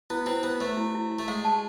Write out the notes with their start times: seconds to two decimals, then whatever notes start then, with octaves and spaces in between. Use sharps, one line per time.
0.10 B3 E4
0.26 C4 E4
0.43 B3 E4
0.61 A3 C5
0.77 E4
0.95 E4
1.11 E4
1.19 A3
1.28 G#3 F5
1.45 A5